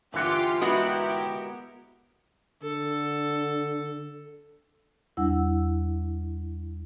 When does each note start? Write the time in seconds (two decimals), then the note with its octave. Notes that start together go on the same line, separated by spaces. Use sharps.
0.14 G1 E3 F4 G4 F#5 D6
0.61 G#3 B3 E4 F#4 G4 A#4
2.62 D3 A4
5.17 E2 G3 D4 E4 F#5 E6